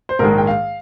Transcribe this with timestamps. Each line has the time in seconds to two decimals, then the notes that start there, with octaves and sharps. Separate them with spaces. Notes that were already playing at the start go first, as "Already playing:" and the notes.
0.09 C5
0.19 A#1 G#2 D#3 G#3 A#4
0.38 G5
0.47 F5